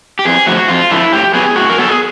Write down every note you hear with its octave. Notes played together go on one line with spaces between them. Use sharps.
G4
F2 G#4
D3 F3 A3 F#4
F2 F4
D3 F3 A3 E4
A2 G4
F#3 B3 G#4
A2 F#4
A#4
F#3 B3 A4
G#4